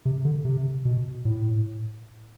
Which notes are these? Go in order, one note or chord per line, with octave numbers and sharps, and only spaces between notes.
C3
D3
C3
B2
A2